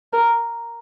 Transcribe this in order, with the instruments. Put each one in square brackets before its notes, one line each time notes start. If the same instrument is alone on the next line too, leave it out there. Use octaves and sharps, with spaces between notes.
[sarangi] A#4